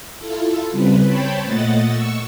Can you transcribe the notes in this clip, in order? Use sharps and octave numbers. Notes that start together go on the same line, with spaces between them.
E4 F4 A4
C#3 G3 C4 B4
C5 C#5 G5 A5 B5
A#2 A3 D#5 F#5 A6
C#6 E6